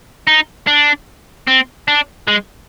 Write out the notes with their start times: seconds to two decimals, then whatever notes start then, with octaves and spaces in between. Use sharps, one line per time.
0.27 D#4
0.67 D4
1.48 C4
1.88 D4
2.28 G#3